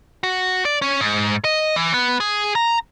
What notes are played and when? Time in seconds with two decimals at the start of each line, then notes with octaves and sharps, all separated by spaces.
0.23 F#4
0.65 D5
0.82 C#4
1.01 G#2
1.45 D#5
1.76 E3
1.94 B3
2.20 G#4
2.55 A#5